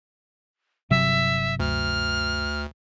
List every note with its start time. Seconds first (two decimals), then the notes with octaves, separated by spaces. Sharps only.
0.90 G1 C3 F#3 E5
1.60 D2 F6